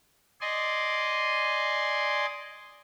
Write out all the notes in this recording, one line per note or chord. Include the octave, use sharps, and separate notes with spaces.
D5 D#5 G#5 C6